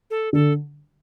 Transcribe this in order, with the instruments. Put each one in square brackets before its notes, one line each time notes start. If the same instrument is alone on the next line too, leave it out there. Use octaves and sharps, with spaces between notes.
[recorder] A4
[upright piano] D3 [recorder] A4